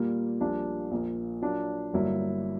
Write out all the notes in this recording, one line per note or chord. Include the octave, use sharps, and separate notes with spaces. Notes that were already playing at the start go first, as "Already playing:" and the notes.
Already playing: A#2 G3 A#3
A#1 A#2 G3 A#3 D4
A#1 A#2 A#3
A#2 F#3 A#3 D4
G1 G2 F#3 A#3 E4